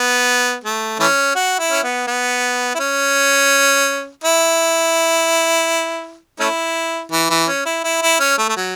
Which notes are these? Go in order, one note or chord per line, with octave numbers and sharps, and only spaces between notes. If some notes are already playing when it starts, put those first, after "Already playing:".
Already playing: B3
A3
E3 A3 C#4
F#4
E4
C#4
B3
B3
E4
C#4
E4
A3 C#4 E4
E3
E3
C#4
E4
E4
E4
C#4
A3
A3
F#3